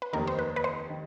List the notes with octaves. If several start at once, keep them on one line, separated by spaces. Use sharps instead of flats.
B4
F1 D#2 D#3 A#4
C5
B4
B4
C5
D#3